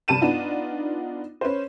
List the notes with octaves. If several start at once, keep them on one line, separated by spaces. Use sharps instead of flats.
G2 C3 A5 D#7 E7
B3 D4 D#4 F4
C#4 B4 C5